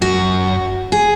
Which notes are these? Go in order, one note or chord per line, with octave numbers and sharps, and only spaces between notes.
F#2 F#4
G#4